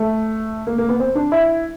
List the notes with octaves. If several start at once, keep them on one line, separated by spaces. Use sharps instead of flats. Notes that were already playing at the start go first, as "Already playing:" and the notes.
Already playing: A3
A#3
A#3
B3
C4
D4
E4